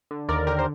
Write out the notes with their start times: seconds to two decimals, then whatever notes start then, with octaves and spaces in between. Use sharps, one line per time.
0.11 D3
0.29 D#2 A#4 D5
0.47 D3 G4 A#4
0.59 C5